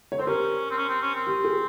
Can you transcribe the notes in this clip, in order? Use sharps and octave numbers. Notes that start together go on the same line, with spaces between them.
C#5
C4 C5
C#4 G4 A#4
C4
C#4
C4
C#4
C4
G4
G#4